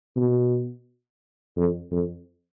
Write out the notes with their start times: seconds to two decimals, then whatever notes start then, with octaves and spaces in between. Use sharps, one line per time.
0.16 B2
1.56 F2
1.91 F2